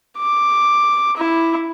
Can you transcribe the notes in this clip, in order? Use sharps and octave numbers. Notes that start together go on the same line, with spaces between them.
D6
E4